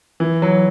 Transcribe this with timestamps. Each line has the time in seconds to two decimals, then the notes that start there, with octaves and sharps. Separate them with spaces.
0.20 E3
0.42 F#3